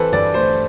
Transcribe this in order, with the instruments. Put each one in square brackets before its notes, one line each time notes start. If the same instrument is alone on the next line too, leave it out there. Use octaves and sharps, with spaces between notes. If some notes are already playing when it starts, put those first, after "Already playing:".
Already playing: [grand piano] E3 C4 A4 B4 C5
G2 D5
A3 C5